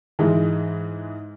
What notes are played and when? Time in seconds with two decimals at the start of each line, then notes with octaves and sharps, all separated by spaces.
0.19 G#2 E3 G#3